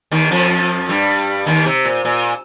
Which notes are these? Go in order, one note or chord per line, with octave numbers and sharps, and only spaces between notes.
D#2 D#3
F2 F3
G2 G3
D#2 D#3
C3
A#2
A#2